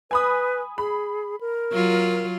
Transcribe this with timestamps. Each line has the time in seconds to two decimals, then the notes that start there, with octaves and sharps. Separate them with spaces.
0.11 B4 G#5 B5 D#6
0.78 G#4 B5
1.41 A#4
1.72 F#3 F4